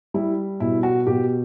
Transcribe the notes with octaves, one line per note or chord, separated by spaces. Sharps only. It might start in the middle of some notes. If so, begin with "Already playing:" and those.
G3 E4
B2 E4
F#4
B2 G4